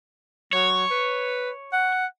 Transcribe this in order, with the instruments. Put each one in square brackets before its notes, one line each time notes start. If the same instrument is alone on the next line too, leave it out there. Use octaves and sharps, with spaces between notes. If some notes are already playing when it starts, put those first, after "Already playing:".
[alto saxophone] F#3 [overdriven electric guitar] C#5
[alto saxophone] B4
F#5